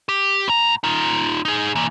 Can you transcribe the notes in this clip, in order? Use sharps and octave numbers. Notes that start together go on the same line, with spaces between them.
G4
A2 A#5
D#4 F4
D#4 G#4
E3 A#3